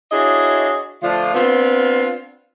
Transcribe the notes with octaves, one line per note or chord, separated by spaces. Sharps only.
D4 E4 F#4 G#4 C#5 D#5
D3 F3 A3 D4 F4
B3 C4 D4 F4